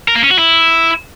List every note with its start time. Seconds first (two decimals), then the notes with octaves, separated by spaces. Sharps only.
0.08 A#4
0.16 A#3
0.23 C#4
0.31 F#4
0.38 E4